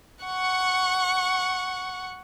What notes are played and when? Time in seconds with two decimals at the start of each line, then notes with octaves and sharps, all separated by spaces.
0.25 F#5 C#6